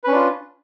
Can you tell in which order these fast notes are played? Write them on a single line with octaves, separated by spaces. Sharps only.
B4 C#4 D4 F4